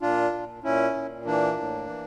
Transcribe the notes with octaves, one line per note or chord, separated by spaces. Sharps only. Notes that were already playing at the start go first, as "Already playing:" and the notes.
A#2 D4 F4
A#2
A#2 C#4 E4
A#2
E3 A#3 D4
A2
E3